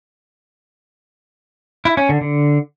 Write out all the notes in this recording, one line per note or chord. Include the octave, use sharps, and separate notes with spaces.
E4
C#4
D3
D3